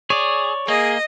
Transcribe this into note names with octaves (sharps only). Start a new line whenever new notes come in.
G#4 C#5 D5
A#3 G#4 D#5